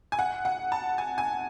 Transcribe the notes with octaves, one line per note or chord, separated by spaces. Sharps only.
G#5
F#5
F#5
A5
G#5
G#5